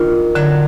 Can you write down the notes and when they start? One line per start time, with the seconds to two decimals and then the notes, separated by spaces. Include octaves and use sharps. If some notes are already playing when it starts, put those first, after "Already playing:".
Already playing: D#3 D4 F4
0.35 D3 F#3